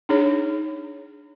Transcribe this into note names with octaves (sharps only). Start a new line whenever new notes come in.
D4 D#4 G#4 C#5